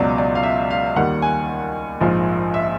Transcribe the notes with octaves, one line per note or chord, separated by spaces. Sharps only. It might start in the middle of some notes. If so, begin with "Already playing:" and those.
Already playing: C#2 B2 F#3 D5
D5
F5
E5
F5
D#2 D#3 G3 F#5
G#5
A#1 G#2 F3
E5